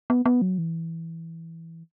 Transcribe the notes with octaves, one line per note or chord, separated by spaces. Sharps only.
B3
B3
F#3
E3